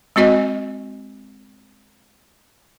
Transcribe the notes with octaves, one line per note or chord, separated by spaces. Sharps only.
G#3 C4 F#4 D#5 G#5